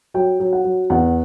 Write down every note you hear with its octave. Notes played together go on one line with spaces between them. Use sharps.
F#3 G5
F#3
F#5
F#3
E2 F#5